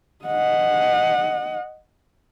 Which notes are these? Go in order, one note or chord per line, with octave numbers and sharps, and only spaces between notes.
D#5 F#5